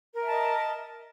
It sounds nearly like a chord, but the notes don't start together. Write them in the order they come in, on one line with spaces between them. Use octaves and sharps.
A#4 E5 A5 D#5